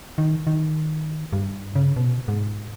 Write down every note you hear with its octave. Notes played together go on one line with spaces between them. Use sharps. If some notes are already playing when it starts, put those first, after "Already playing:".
D#3
D#3
G2
C#3
B2
G#2